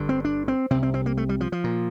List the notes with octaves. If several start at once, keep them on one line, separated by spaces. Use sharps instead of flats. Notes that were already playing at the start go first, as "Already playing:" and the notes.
Already playing: G1 G2 D3
C4
D4
C4
C2 C3 C4
C4
C4
A#3
A3
G3
F3
F3
A#2